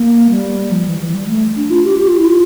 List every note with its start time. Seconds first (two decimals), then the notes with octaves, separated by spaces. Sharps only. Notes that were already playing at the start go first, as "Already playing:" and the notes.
Already playing: A#3
0.29 G3
0.71 F3
0.86 E3
1.00 E3
1.14 G3
1.28 A3
1.57 D4
1.70 F4
1.84 G4
1.98 G4
2.08 F4
2.17 E4
2.26 F4